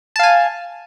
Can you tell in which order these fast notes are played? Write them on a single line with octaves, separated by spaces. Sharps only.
A5 F5 G#5